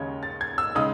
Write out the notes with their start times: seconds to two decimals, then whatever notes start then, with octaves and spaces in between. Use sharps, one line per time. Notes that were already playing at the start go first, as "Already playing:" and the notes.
Already playing: D#2 C#3 G#3 C#4 G#6
0.23 A6
0.41 G#6
0.58 E6
0.75 C#3 G#3 D#4 D#6